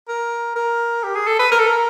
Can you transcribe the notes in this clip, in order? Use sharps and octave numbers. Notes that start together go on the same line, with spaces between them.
A#4
A#4
G4
G#4
A4
B4
A#4
A4
A#4